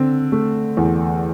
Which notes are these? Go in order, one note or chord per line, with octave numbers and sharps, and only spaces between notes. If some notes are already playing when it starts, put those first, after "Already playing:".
Already playing: D3 C4
A3
E2